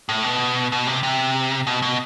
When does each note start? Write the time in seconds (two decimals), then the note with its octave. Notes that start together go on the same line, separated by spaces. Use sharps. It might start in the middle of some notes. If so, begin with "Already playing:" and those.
0.09 A2
0.24 B2
0.72 B2
0.87 C3
1.03 C3
1.67 B2
1.82 B2